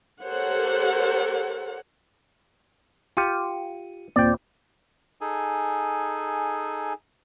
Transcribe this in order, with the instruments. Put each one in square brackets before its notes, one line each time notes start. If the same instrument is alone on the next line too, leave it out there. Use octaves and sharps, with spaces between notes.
[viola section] G4 A4 A#4 C5 C#5 F#5
[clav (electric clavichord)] F4 G4 [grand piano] C#7 D#7
[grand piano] D#2 A#2 C4 [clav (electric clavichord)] D5 G5
[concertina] D#4 G#4 A4 G#5